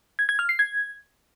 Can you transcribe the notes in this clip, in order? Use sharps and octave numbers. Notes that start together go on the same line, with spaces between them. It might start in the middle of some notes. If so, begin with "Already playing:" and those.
G#6
G#6
F6
C7
G#6